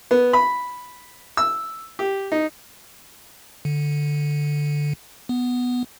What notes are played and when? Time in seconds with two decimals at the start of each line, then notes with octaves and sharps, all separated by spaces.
0.11 B3
0.33 B5
1.37 E6
1.99 G4
2.32 D#4
3.65 D3
5.29 B3